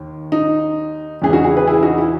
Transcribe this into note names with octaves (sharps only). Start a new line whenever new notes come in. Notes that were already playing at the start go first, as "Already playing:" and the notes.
Already playing: D#2 D#3
D#4
E2 C#3 E3 G#4
D#4 F#4
E4 G#4
G#4 B4
E4 G#4
D#4 F#4
E4